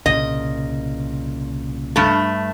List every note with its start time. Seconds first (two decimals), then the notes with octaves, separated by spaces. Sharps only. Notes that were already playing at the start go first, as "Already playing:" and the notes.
0.06 C2 A#2 C#3 D#5
1.96 G2 A3